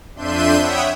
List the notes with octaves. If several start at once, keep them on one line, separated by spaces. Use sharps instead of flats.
F2 D4 E5 C6 G6 D#7
C#5 E5 F#5 G5 B5 D#6